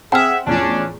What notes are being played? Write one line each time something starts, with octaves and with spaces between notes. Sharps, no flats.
C4 G#4 E5 F#5 G5 F6
E2 A2 F3 C#4 D4